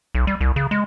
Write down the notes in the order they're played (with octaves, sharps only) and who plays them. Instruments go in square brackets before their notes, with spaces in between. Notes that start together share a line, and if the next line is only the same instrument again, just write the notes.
[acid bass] B1
G3
C2
C#3
G#3